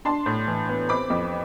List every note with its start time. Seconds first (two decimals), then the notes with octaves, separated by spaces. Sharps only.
0.05 D4 A5 C6
0.26 A2
0.47 E3
0.69 B3
0.89 C4 B5 D6
1.10 F2